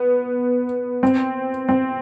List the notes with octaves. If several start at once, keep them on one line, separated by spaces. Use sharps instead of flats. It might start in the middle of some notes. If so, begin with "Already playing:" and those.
Already playing: B3
C4
C4